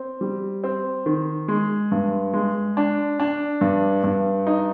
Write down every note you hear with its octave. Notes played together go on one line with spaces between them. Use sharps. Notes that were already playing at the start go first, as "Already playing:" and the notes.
Already playing: C4
G3
C4
D#3
G#3
G2
G#3
D4
D4
G2
G2
D#4